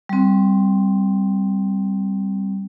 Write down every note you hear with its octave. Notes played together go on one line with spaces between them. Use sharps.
G3 C4